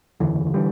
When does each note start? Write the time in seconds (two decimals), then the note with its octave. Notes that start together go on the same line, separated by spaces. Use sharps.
0.20 F#1 E2 D3 E3
0.54 D3 E3 G3